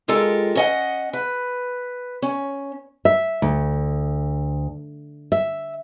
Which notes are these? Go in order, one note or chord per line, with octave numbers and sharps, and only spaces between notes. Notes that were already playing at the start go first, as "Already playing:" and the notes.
G#3 F4 G4 A4 A#4
C#4 D#5 F#5
B4
C#4
E5
D2
E5